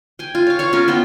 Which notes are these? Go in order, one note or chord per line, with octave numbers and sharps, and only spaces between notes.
G5 G#5
F4
C#5 F5
C#5 F5 C#6
C#4 F4 A#4
B3 F4 A#4 G5